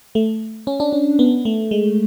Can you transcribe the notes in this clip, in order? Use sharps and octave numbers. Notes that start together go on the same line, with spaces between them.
A3
C#4
D4
C#4
B3
A3
G#3